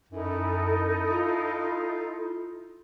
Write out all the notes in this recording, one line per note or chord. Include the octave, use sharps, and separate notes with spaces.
F#2 D#4 E4 A4
F4